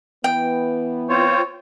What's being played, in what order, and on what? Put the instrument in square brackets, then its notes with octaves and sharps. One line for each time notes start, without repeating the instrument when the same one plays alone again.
[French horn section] E3 B3 [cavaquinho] G5
[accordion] C4 F4 C5 [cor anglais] C#5